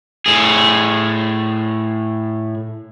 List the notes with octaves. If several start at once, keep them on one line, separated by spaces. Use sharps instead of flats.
A2 G#4